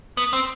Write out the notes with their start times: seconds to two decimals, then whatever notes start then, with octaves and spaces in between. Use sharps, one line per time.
0.17 B3
0.33 C4